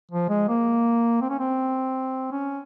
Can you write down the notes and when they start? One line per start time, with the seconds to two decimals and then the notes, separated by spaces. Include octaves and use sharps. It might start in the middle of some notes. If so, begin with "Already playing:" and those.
0.11 F3
0.29 G#3
0.48 A#3
1.21 C4
1.30 C#4
1.39 C4
2.32 C#4